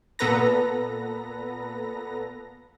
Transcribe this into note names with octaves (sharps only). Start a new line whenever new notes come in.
A#2 B3 A4 B4 A#5 A#6